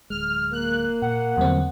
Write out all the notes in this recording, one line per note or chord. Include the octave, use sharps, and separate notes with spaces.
D1 G#3 F6
A#3 F#6
A#2 F#5
E2 D3 F#3 G3 C4